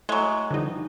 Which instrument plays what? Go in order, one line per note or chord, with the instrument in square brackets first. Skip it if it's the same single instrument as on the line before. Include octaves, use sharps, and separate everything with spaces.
[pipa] F#3 G#3 [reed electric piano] A3 E4 G#5
[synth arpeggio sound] D3 D#4 [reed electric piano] E3 F3 G3